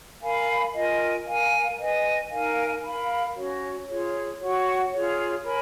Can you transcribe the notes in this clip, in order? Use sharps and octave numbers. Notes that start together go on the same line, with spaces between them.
A#4 F5 G#5 B5
F4 A#4 D#5 G#5
A#4 F5 G#5
B4 D#5 G#5
D#4 A#4 F5 G#5
A#4 F5 B5
C#4 F#4 C#5
F4 G#4 C#5
F#4 C#5 F#5 C#6
F4 G#4 C#5
A#4 C#5 G#5 B5